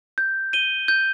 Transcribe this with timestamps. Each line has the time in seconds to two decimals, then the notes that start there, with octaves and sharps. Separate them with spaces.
0.18 G6
0.53 D#7 G7
0.88 G6